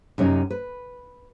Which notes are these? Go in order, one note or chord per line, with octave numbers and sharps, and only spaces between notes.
F#2 C3 C#4 D#4
B4